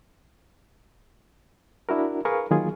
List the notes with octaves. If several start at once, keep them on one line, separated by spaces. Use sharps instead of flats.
D4 E4 F#4 A#4
G#4 A#4 B4 F5 C#6
D#3 F#3 A#3 F4 G#4